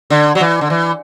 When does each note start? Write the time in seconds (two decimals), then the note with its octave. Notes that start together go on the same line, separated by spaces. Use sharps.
0.10 D3
0.35 F#3
0.40 E3
0.61 D3
0.70 E3